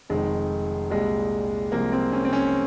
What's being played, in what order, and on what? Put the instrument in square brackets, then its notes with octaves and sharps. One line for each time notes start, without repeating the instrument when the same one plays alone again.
[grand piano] F1 F2 D#3 G#3
C2 A#2 G3 G#3
C2 C3 F3 G#3 A#3
C4
C#4
C4
C#4